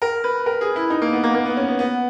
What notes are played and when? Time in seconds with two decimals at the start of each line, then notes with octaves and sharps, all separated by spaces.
0.02 A#4
0.24 B4
0.46 A#4
0.61 G#4
0.76 E4
0.90 D#4
1.02 A#3
1.12 B3
1.24 A#3
1.35 A#3
1.46 B3
1.57 C#4
1.68 B3
1.79 B3